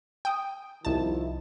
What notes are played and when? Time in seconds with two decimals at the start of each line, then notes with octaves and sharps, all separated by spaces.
0.25 G5 D#6
0.85 C2 D#3 F3 E4 A5